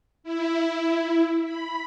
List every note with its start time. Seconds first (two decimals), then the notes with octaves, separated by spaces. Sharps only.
0.24 E4
1.44 B5